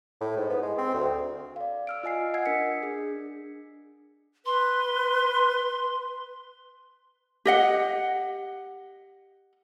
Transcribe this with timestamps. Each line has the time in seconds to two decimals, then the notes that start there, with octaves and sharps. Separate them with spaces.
0.21 A2
0.37 G#2
0.50 B3
0.62 G#3
0.78 C4
0.94 D2
1.56 D5 F5
1.87 E6 F6 D7
2.03 F4 D#5 G#5 C7
2.34 D#5 F#5 G#5 E6 G#6 C7
2.46 D4 A#4 B6 C#7
2.83 D4 G#4
4.46 B4 C6
7.46 G4 D#5 F#5